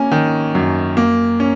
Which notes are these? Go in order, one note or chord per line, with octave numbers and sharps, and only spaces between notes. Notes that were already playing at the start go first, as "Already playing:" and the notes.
Already playing: A#3 C#4 G#5
D#3
F#2
A#3
C#4